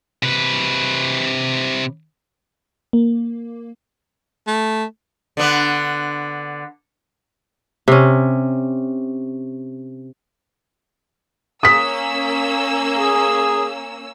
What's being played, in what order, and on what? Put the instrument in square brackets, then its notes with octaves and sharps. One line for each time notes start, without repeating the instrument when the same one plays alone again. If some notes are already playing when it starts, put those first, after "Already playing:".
[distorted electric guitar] C3 B4
[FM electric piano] A#3
[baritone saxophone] A3
[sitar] D3 B3
[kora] C3 C#4
[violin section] A#3 C#4 E6 [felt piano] D#6 B6
[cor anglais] G#4